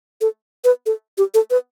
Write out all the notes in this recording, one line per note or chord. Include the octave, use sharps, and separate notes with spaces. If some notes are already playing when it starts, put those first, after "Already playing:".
A4
B4
A4
G4
A4
B4